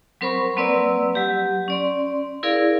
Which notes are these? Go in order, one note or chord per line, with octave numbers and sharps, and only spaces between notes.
F#3 C4 A#4 C5 B5 C#6
F#3 A#3 C4 B4 D5 E6
F#3 G4
C#4 D5 C6
E4 G#4 A#4 D5 F5